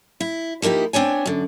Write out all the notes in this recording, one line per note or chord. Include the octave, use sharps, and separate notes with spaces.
E4
F3 A#3 D#4 E4 G4
B3 C4 D4 C#5 G#5
F#2 D3